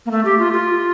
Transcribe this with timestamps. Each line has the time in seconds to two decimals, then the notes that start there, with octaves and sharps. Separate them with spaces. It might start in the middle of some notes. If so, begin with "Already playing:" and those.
0.06 A#3
0.11 A3
0.25 G4
0.39 F4
0.53 F4